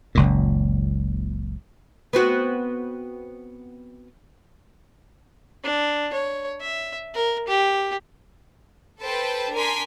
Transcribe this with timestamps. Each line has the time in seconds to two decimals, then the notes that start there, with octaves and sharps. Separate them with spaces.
0.15 F#1 C#2 A#2
2.13 B3 C4 F#4
5.64 D4
6.13 C#5
6.61 E5
7.15 A#4
7.48 G4
9.01 A4 B4 C5 G5 A5
9.54 D4 A#4 G#5 C6 B6